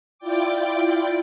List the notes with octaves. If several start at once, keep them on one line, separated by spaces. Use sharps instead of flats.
E4 F4 D5 G5 D6